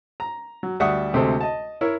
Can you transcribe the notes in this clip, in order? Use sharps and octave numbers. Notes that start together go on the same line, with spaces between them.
A#5
F#3
D2 G3 E5 F#5 C#6 D#6
D2 C3 G#3 A4 C5
D#5 A5
E4 A#4 C#5